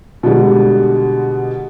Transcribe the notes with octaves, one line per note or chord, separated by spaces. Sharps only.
B2 D3 G3 G#3